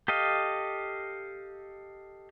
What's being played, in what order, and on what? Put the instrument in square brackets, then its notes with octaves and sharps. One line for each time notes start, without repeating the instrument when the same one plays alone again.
[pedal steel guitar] G4 A4 D#5 F5